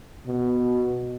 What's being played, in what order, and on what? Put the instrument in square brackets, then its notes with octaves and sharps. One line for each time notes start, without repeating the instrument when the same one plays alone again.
[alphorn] B2